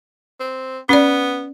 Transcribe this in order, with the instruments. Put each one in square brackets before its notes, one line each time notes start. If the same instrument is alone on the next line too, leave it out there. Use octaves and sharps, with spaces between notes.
[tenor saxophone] C4
[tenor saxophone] B3 [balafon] C#4 D5